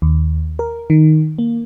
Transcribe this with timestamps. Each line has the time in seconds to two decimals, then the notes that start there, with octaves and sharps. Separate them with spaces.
0.02 D#2
0.59 A#4
0.90 D#3
1.38 A#3